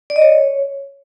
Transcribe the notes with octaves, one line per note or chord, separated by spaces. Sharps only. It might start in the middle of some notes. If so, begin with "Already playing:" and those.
D5
D#5
C#5